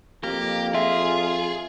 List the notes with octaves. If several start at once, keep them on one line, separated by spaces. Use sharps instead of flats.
F2 A#3 G4
F4 G#4 E5